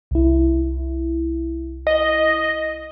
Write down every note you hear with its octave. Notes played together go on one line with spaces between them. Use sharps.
C2 E4
D#5